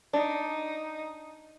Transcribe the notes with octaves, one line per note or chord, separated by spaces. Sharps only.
D4 D#4